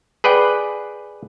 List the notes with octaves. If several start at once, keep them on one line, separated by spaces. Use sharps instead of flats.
G#4 B4 D5 F#5 G5